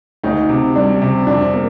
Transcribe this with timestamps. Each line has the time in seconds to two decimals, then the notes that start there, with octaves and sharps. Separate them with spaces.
0.23 D2 D#4
0.49 C3
0.75 G3 D4
1.02 C3
1.27 F2 D4
1.53 A#3